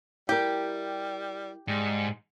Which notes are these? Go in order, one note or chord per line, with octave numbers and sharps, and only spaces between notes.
G3 E4 G4 A#4
G#2 G3